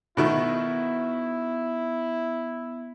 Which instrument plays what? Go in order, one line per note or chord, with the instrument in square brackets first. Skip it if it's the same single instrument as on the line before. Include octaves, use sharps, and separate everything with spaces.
[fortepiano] B2 D#3 A3 [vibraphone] B3 [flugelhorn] E4